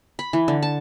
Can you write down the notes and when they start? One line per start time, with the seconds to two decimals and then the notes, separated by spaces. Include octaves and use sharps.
0.19 B5
0.33 E3
0.48 D3
0.62 A5